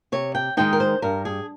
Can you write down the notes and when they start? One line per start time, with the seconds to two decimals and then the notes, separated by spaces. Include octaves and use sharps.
0.12 C3 C#5
0.35 G5
0.57 D#3 G#3 D#4 G5
0.73 A#4
0.80 C5
1.02 G2 A#4
1.25 G#4